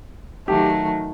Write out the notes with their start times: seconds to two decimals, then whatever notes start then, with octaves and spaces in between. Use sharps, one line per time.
0.48 D#3 F#3 A3 G4